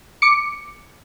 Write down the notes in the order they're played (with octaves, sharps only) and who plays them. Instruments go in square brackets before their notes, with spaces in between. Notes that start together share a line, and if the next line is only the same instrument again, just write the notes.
[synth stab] D6 C#7